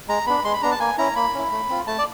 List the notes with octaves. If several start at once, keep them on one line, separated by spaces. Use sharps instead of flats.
G#3 A#5
B3 D4 B5
G#3 C6
B5
B3 D4 A#5
A5
A#3 G#5
C#4 E4 A#5
A#3 B5
C#4 E4
A3
C4 F4
A3 A5
D5